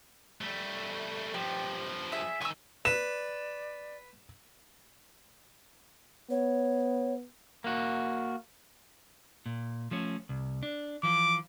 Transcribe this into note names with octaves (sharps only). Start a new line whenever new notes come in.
G3 A3
G2 F3 G4
G#4 E5
D#3 G#5 C#6 E6
B4 D5 E7
B3 C#5
A#3 F#4
A#2
F3 A3 C#4
C2
D4
E3 F3 D6